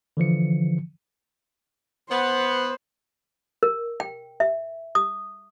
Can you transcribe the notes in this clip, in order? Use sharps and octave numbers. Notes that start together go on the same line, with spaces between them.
D3 E3 F3 C#7
B3 C5
A#4
G5
E5
D#6